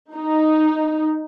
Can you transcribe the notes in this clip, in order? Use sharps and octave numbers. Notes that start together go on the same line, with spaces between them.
D#4